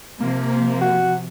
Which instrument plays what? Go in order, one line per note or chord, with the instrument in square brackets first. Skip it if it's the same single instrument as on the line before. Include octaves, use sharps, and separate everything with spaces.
[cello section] C3 F3 [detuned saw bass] A#3
[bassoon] F#4